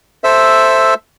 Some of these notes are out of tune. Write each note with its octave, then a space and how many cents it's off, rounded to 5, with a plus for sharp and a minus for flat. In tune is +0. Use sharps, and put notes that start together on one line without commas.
A4 +0 C5 +0 E5 +0